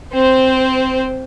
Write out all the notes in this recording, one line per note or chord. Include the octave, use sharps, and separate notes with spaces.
C4 C5